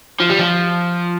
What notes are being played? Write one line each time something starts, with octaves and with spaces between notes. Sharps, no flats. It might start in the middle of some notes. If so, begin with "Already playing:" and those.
F3
G3
F3